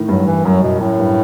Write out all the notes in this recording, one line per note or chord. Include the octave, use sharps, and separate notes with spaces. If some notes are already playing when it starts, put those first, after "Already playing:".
Already playing: A2 D#3 E3
G2 F#3
E3
F#2 F#3
B2
F#2 A2
G2